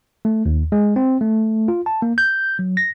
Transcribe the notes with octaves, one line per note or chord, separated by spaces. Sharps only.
A3
D#2
G#3
C4
A3
F4
A5
A#3
G6
F#3
A#6